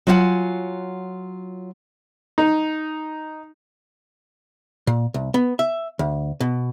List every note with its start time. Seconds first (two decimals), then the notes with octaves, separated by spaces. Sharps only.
0.07 F#3 F4 D#5 F5 F#5 G#5
2.38 D#4
4.87 A#2
5.14 C2
5.34 B3
5.59 E5
5.99 D2
6.40 B2